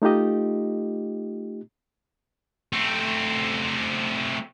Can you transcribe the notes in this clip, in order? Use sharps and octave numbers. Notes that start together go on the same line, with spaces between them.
A3 D#4 F4 G4 D#5
A3 C4